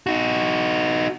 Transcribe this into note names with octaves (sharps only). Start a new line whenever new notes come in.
D#4 F#4